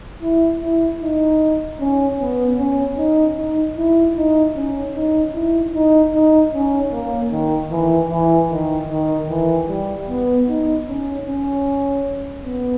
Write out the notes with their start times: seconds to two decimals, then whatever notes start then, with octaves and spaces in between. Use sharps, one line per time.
0.22 E4
0.62 E4
1.01 D#4
1.80 C#4
2.19 B3
2.59 C#4
2.98 D#4
3.38 D#4
3.77 E4
4.17 D#4
4.55 C#4
4.95 D#4
5.35 E4
5.75 D#4
6.14 D#4
6.53 C#4
6.92 A#3
7.32 D#3
7.71 E3
8.11 E3
8.50 D#3
8.90 D#3
9.29 E3
9.68 G3
10.09 B3
10.48 D#4
10.88 C#4
11.27 C#4
12.45 B3